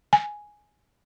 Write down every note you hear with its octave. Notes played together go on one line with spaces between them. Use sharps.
G#5